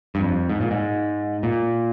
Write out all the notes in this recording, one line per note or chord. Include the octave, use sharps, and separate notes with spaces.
G2
F2
G#2
A#2
G#2
A#2